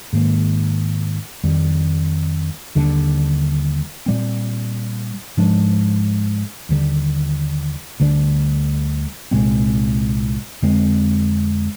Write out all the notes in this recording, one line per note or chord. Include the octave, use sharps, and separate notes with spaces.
G#2 D#3 A#3
F2 D#3 G3
D#2 D3 G3 D4
A#2 G3 C4
G#2 F3 G#3 D4
D#2 D3 G3
D2 D3 G3 D4
C2 A#2 G#3 C4
F2 D3 G#3 C4